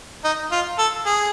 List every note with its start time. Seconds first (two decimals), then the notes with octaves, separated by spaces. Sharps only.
0.24 D#4
0.52 F4
0.78 A4
1.06 G#4